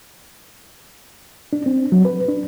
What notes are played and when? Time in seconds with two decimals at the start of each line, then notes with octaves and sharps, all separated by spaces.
1.53 D4
1.66 C4
1.92 F#3
2.05 B4
2.28 D4